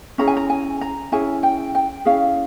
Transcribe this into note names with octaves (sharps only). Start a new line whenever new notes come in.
C#4 E4 G#4 A#5
G#5
A#5
G#5
A#5
C#4 E4 G#4 G#5
G5
G5
C#4 E4 G#4 F5